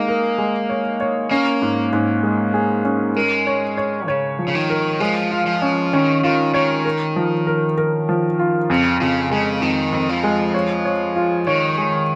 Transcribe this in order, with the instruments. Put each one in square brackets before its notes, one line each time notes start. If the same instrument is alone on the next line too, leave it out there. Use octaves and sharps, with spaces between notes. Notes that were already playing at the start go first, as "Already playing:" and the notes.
Already playing: [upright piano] G#3 D#4 [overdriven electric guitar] A#3
[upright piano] A#4
G#3
C#5
C#5
[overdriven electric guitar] A#3 [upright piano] C#4
[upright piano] G#2
G#2
G#3
G#4
C#4
[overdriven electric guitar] G#3 [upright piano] A#4
[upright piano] C#5
C#5
[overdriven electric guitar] C#3 [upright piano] C#5
[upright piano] F3
[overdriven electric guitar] C#3
D#3
[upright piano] A#4
[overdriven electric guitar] F3 [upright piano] G#3
[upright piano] F4
[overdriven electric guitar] F3
[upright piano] C#4
[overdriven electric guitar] D#3 [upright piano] C#4
[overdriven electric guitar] D#3 [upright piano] F4
[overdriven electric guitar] D#3 [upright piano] C#5
[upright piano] A#4
F3
A#4
A#4
F3
F4
[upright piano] F2 [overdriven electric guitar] C#3
[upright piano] F2 [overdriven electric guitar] C#3
[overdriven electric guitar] C#3 [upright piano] G#3
[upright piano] F2 [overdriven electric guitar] D#3
[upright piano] F2
[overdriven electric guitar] F3
[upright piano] G#3
C#5
C#5
F4
[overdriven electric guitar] D#3 [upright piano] C#5
[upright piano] G#3